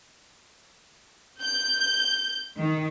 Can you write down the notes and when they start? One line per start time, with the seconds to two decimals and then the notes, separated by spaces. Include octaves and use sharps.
1.42 G6
2.59 D#3